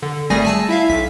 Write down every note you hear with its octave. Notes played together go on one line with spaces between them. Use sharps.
D3
G#1 G3 A3 G#4 G#5 A#6
G#5 A5 E6
E4 E5 F5
B1 B6